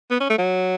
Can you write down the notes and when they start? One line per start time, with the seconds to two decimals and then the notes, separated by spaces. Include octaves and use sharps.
0.11 B3
0.20 C#4
0.30 A3
0.38 F#3